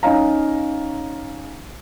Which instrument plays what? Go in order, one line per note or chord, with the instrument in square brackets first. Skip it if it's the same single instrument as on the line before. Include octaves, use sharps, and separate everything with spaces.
[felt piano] C#4 D#4 C#5 F5 A#5